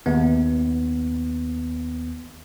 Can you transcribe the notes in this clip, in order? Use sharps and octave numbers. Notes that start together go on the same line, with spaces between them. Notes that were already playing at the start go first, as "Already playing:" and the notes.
D#2 B3